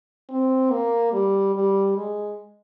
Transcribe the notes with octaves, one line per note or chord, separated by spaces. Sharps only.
C4
A#3
G3
G3
G#3